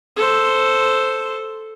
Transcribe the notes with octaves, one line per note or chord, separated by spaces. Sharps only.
A4 C5